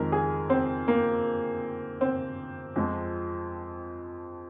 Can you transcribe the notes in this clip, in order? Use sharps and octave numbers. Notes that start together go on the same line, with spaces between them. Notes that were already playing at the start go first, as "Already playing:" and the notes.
Already playing: F2 D#3 G#3 A#4
G#4
C4
A#3
C4
F2 F3 G#3